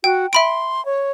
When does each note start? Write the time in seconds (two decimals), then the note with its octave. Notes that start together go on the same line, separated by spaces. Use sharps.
0.04 F#4 G5
0.33 E5 B5 C6 D7
0.86 C#5